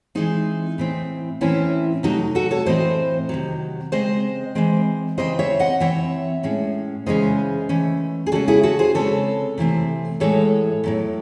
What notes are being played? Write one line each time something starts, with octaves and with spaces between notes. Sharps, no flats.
E3 G#3 C4 D#4
A2 E3 C4
A2 E3 C4 C#4 E4
C3 F#3 A3 D#4 F#4
F#4 A4
A4 C#5
A2 E3 C4 C5 D#5
C3 D#3 F#3
C#3 G#3 C4 C5 D#5
E3 G#3 C4
C#3 E3 C4 C5 D#5
C#5 E5
D#5 F#5
E3 C4 C#5 E5
A2 G#3 C#4
C#3 E3 G#3 C#4 C5 D#5
E3 A3 C#4
G#4
C#3 G#3 C#4 F#4 A4
E4 G#4
F#4 A4
G#4 C5
C#3 G#3 C4 A4 C#5
C3 E3 A3 C4
A2 E3 G#3 A4 C#5
A2 F#3 A3